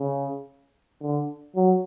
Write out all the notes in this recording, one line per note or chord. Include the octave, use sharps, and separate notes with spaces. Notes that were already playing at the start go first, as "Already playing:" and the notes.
Already playing: C#3
D3
F#3